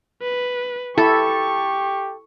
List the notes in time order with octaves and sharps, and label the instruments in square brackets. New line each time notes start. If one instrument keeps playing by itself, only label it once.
[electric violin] B4
[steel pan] E4 [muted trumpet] G4 [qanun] A4 [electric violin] C#6